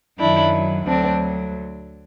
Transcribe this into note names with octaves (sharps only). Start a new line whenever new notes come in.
F#2 D#3 F#3 D4 E4
D2 D3 F#3 C4 D4